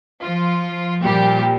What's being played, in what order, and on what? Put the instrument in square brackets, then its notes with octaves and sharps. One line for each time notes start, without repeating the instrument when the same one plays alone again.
[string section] F3 F4
A#2 F3 G3 G4